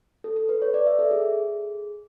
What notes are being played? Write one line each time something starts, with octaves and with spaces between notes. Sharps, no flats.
A4
A4
B4
C#5
D5
E5
A4
G#4